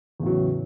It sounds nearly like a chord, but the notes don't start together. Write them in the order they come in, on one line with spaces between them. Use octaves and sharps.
E2 A2 F#3 C#3